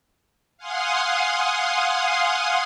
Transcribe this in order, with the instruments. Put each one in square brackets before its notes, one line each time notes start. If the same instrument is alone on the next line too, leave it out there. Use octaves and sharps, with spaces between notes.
[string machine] F5 F#5 G#5 C6 D#6